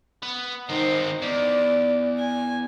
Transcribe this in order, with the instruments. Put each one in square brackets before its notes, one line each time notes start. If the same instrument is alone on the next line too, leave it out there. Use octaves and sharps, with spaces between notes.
[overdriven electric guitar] B3
[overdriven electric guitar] D#3 C4 [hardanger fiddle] D#4 C5
[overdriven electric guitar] E2 [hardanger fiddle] D5
[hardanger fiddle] G#5